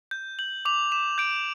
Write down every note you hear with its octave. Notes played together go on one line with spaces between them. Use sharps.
G6
G6 F#7
D6 F7
D6 E7
G6 D7